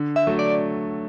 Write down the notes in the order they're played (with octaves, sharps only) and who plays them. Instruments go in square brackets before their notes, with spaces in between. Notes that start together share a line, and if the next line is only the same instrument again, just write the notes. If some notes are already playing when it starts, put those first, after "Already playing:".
Already playing: [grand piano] D3
[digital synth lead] E5
[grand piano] F#3 A3
[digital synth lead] D5